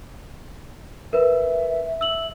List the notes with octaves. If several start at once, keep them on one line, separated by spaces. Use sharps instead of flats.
A#4 B4 E5
E6 F#7